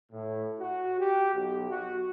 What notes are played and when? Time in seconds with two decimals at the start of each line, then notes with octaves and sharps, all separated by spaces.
0.12 A2
0.59 F#4
0.99 G4
1.34 B1
1.69 F#4